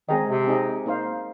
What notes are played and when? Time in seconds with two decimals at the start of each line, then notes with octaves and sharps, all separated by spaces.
0.09 D#3 G#3 C4 G#4 D#5
0.28 C3
0.47 C4 D#4 G#4 D#5
0.86 A#3 D#4 C5 F5